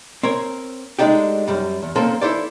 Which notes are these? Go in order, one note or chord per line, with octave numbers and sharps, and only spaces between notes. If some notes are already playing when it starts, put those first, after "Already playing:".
C4 A#4 C#5
G#3 A3 D4 D#4 G4
F#2 G3
E2
F3 A#3 C4 C#4 A4 A#4
E4 A4 C5 D5